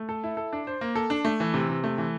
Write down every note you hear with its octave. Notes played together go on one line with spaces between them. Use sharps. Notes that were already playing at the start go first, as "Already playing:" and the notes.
Already playing: A3
A4
E4
A4
D4
C5
A#3
A4
D4
A3
E3
C3
C3
A3
E3